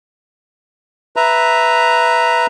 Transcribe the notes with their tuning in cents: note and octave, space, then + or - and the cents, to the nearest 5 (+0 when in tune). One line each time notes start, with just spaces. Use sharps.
B4 +0 E5 +0 A#5 +0